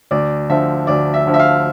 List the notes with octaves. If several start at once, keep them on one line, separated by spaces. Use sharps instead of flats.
D2 D5
D3 F3 E5
D2 D5
E5
D3 F3
E5
F5